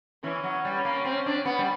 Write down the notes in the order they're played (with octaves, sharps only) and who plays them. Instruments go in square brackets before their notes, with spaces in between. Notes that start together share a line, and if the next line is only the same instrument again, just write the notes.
[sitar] E3 [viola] C#4
[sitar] F#3
G3
A#3
C4
D4
B3
G3